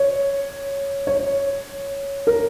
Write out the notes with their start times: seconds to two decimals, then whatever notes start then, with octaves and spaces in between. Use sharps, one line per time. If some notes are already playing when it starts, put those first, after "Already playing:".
Already playing: C#5
1.07 C#5
2.27 A#4